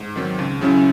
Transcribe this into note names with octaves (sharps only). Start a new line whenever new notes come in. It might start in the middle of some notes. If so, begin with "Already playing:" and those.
Already playing: G#2
D#3 F#3 C4
C#2
C#3 F#3 C#4 E4